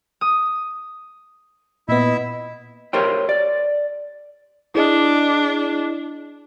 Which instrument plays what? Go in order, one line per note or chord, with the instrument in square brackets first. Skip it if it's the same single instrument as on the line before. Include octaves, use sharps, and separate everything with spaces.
[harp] D#6
[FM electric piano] A#2 B3 [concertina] E4 E5 [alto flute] D#5
[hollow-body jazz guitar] G4 A#4 C5 C#5 G5
D5
[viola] D4 [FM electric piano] E4 G#4 D#5